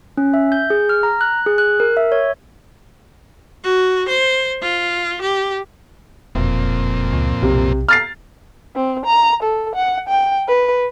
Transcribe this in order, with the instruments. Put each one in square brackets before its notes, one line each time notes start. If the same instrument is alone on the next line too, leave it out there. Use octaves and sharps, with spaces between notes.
[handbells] C#4
E5
G6
G#4
F6
A#5
F#6
G#4
F#6
A#4
E5
C#5
[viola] F#4
C5
F4
G4
[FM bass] E1 [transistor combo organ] F2 A#2 C4
[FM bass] C#2
[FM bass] B1 [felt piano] C3
[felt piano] F6 A6 C7
[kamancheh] C4
A#5
A4
F#5
G5
B4